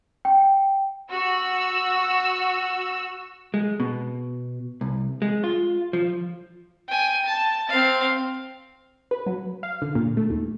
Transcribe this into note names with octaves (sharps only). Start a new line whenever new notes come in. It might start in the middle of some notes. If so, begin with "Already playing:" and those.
G5
F#4 E6
G#3
B2
C2
G#3
F4
F3
G5 G#5
A5
C4 F5
B4
F#3
F5
D3
A#2
A3
D#2